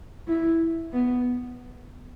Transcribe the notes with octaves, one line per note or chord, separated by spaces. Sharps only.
E4
B3